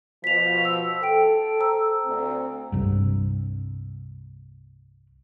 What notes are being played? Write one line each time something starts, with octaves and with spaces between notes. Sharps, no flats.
B2 F3 B6 F7
E6
A4 G5 D7
C5 A#5 E6
D2 C4
C2 G2